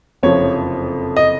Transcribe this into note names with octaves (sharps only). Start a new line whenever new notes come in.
F#1 F2 C3 F3 C#5
D#5